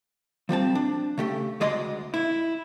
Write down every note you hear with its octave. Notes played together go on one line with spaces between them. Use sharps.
F3 G3 C4 A5
D4
C#3 A3 G4
D2 G#3 D5 D#5 C6
E4